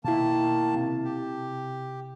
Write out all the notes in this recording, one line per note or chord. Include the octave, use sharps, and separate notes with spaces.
B2 D#3 A#3 E4 A5
C3
G4